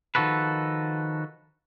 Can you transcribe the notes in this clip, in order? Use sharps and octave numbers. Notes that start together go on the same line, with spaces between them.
D#3 F3 F#4 A4 B4